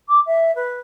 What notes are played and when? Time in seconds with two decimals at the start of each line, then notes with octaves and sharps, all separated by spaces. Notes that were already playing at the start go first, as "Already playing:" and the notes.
0.09 D6
0.26 E5
0.56 B4